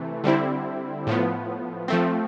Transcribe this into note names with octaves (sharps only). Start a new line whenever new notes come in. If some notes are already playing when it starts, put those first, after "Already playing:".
Already playing: C3 E3 A3
D3 G3 C4 E4
A2 F3 B3
F3 A3 C4